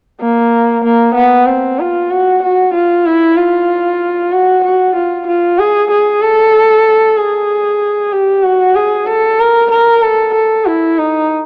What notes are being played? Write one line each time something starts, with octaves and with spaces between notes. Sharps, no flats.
A#3
A#3
B3
C4
F4
F#4
F#4
F4
E4
F4
F#4
F#4
F4
F4
G#4
G#4
A4
G#4
G4
F#4
G#4
A4
A#4
A#4
A4
A4
E4
D#4